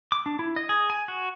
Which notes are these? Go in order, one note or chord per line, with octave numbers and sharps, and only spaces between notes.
D6
D4
E4
D#5
G#4
G#5
F#4